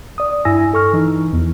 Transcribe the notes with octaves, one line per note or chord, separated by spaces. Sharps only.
D5 D#6
G2 E4 G#5 E6 A#6
A4 C#6 F6
E3 D#4
E2 E3